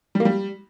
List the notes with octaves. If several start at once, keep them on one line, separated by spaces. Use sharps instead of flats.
G3
A#3
G3